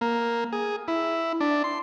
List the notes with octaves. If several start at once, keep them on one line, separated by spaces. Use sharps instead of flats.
A#3
G#4
E4
D4
C6